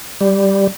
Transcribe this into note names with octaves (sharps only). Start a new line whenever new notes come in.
G3